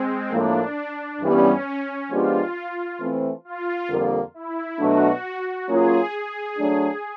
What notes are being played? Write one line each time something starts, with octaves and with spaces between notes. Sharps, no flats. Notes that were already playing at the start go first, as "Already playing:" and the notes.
Already playing: G#3 C4
A2 F3 A#3 D4
G2 E3 G3 B3 C#4
F3 G#3 B3 D4 F4 G4
E3 A3 C4
F4
F2 D3 G3 A#3
E4
B2 F#3 A3 D4 F#4
F#3 A#3 C#4 F4 G#4
G#4
F#3 A3 D4